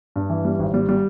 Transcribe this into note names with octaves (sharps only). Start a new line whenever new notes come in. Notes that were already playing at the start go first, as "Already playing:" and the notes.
G2
E3
G3
G#1
G3
G3